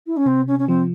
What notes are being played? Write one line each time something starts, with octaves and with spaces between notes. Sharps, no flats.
E4
C#4
C3 C4
C#4
C#4
F3 C4